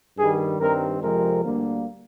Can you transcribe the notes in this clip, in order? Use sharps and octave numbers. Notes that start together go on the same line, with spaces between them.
G2 D#3 G3 G#4
G2 D#3 G3 C4 A#4
F2 C3 F3 G#3 C4 A#4
D2 D3 G3 A#3